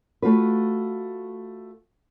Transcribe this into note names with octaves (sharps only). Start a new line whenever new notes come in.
A3 F4 F#4 B4